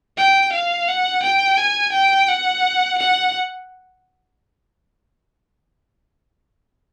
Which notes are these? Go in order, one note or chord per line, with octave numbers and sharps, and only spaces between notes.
G5
F5
F#5
G5
G#5
G5
F#5
F#5